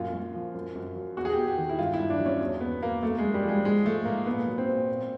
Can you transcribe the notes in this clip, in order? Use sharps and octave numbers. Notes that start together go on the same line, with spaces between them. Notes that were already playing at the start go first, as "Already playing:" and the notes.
Already playing: F#2 A#2 F4
F#2
F3
F#2
F#2
F#3
E2 F#4
G#4
E2 G4
G4
D#3
E4
G2 F4
E4
G2
D4
F#3
C#4
E2
E2 B3
F#3 A#3
F#2 A3
G#3
F#2
G3
F3 G#3
G#2 G#3
F3 A3
G#2 A#3
A#2 B3
F#3
C4
A#2
A#2